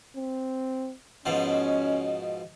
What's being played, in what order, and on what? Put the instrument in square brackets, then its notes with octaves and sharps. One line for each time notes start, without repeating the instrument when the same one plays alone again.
[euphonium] C4
[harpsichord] G#2 B2 F3 [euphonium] C#4